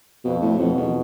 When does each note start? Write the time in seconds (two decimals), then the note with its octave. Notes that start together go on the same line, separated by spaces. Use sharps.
0.25 F2 B2
0.42 A2
0.59 F2 B2
0.77 E2